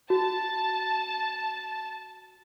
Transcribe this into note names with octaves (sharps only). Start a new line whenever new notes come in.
F#4 A5